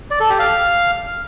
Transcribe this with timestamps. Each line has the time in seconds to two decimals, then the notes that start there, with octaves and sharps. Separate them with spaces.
0.11 D5
0.20 A4
0.30 G4
0.39 F5